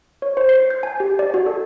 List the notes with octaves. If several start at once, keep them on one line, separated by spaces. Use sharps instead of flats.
C#5
C5
C7
G6
G#5
G4
D5
F#4
A4